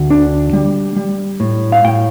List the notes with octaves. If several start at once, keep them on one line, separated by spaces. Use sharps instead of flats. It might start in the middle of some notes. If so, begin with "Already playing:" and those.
Already playing: D2
D4
G3
G3
A2
F5
A2 G5